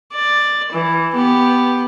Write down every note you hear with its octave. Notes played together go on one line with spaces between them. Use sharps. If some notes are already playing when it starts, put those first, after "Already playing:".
D5
E3
B3 G4